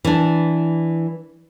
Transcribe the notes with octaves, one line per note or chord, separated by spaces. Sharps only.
E3 D4